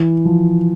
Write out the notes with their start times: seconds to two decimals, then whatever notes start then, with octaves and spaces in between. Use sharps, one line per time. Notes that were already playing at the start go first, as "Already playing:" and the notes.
Already playing: E3
0.25 F3